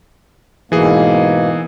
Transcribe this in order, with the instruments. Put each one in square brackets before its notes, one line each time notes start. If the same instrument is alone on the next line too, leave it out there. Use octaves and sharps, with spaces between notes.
[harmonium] G#2 B2 A#3 [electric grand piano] E3 G#4